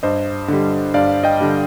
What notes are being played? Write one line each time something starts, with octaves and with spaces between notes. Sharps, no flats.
G2 C5 D#5
D3 G3
G2 D5 F5
D#5 G5
D3 G3